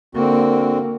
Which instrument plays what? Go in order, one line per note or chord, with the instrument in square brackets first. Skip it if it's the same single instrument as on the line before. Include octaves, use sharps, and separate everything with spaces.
[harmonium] D3 C4 F#4 [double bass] A#3